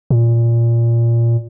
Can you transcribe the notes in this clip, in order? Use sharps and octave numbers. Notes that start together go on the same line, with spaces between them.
A#2